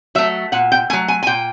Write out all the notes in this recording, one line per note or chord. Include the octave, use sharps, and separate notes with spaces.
F#3 A3 E5
A#2 F#5
G5
F#3 A3 G#5
G#5
G#5
A#2 G5